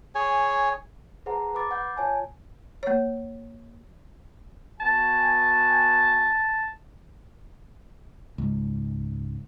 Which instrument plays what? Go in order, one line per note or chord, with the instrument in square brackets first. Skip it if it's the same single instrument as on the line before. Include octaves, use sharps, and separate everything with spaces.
[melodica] G#4 C#5 G#5
[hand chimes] G#4 B4 C5 F#5 A5 A#5
B4 B5 D6 A6
F#5 G6
F4 C#5 G#5 A5
[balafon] A#3 C#5
[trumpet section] B3 F#4 G#5 [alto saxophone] A5
[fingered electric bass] C#2 G#2